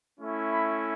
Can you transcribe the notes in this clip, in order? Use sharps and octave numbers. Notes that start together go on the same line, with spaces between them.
A3 C#4 E4
B5